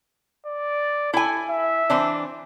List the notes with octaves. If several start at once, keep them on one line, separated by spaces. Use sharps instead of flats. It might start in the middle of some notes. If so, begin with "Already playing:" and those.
D5
E4 A4 G#5
E5
E3 C4 D4